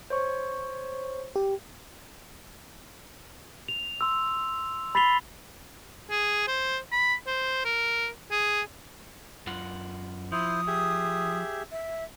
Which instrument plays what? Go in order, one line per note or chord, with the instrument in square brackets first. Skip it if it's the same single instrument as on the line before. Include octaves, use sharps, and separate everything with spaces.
[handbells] C5 C#5 C#6
[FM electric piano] G4
[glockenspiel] F7
C6 E6
B5 A6 B6 C7 F7 G7
[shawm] G#4
C5
B5
C5
A#4
G#4
[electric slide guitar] F#2 F4 F#5
[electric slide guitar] F3 [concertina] E4 C5 [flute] D#6
[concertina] G4 G#4 E5
[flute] E5